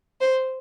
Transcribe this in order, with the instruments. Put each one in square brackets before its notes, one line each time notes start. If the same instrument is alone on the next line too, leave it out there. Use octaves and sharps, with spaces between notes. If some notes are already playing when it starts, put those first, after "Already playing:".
[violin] C5